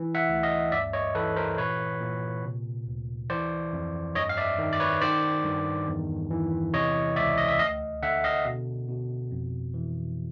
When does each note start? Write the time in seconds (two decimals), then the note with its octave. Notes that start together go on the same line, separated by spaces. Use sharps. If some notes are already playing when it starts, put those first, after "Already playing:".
Already playing: E3
0.15 E5 F#5
0.29 D2
0.43 D#5 F5
0.72 G2 D5 E5
0.93 C#5 D#5
1.15 E3 A4 B4
1.36 A#4 C5
1.58 A#2 B4 C#5
2.01 A#2
2.44 C3
2.87 D2
3.30 E3 C5 D5
3.73 F2
4.15 G2 C#5 D#5
4.29 F5
4.37 D5 E5
4.58 D#3
4.73 D5
4.80 B4 C#5
5.01 D#3 C5 D5
5.45 G2
5.88 E2
6.31 E3
6.73 C3 C#5 D#5
7.16 C#2 D5 E5
7.38 D#5
7.48 E5
7.59 D2 D#5 F5
8.03 D3 E5 F#5
8.24 D#5 F5
8.45 B2
8.88 B2
9.31 F2
9.74 E3